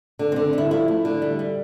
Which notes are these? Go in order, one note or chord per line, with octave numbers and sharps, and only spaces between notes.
D3
C4
D3
G3 E4
F3 E4
A3
D3
G3
G3